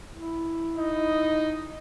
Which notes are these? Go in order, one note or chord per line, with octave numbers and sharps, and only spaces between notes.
E4
D#4